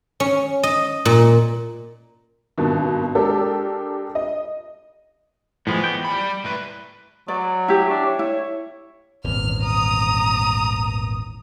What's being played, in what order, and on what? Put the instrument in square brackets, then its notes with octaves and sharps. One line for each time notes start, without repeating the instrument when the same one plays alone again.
[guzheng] C#4
D#5
A#2
[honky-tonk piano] G#1 G2 B2 D#3
G#3 D4 G4 A4 A#4
D#5
[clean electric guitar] A2 F3 G#3 [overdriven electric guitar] E3 B3
[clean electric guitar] G5
[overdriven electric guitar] G3 B5
A2 B4
[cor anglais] F#3 [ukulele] D5
[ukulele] E4 G4
[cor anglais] D4
C#5
[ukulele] E4
[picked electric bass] D#1 G#1 E2 [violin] F6
[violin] A#5 D#6